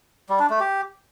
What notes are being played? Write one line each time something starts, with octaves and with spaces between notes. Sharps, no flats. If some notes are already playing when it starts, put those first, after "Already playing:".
G3
D4
A3
G4